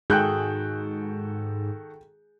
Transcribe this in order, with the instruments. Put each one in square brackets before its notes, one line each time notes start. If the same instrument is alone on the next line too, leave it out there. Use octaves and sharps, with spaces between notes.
[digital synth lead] G#2 [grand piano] D#3 F#4 A4 [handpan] G#4 [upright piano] G5 F#6 G6